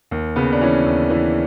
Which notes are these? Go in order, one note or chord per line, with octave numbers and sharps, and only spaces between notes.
D#2
C#3 B3
D4
E3 C#4
D#2
E3